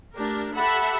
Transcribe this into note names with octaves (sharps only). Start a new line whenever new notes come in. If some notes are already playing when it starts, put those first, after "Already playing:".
A3 D4 G4 A#4
G4 A4 E5 F#5 A5 B5